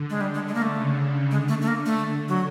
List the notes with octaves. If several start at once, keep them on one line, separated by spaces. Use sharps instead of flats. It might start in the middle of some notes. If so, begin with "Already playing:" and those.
Already playing: D3
G#3
G3
G#3
G#3
A#3
A3
C#3
D3 G#3
A3
A3
A#3
A3
F#3